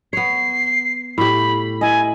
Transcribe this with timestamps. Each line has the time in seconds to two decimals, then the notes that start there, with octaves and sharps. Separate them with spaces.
0.13 B3 C#5 C7
1.18 A2 G4 B5
1.81 E4 D#5 G#5